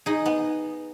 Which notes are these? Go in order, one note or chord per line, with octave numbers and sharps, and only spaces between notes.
D#4 G#4
B3